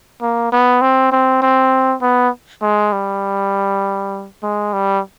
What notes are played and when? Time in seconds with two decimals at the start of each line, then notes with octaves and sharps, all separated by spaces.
0.22 A#3
0.52 B3
0.82 C4
1.12 C4
1.42 C4
2.02 B3
2.62 G#3
2.92 G3
4.43 G#3
4.73 G3